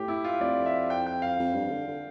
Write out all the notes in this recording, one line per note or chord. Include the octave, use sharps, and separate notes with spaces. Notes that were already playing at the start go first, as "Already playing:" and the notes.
Already playing: A2 G4
E4
F4
F2 D5
E5
G5
G5
F5
F2
G2
D3
D3